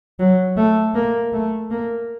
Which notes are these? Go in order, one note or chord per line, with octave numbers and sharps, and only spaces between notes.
F#3
A3
A#3
A3
A#3